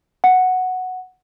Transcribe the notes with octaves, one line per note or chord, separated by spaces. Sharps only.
F#5